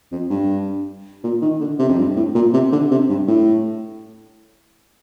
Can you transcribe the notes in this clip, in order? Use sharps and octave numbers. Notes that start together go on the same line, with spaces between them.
F2
G2
A#2
D#3
D3
C3
F2
G2
A2
A#2
C3
D3
C3
G2
A2